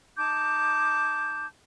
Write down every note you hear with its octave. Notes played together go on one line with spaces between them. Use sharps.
D#4 A5 D6 G6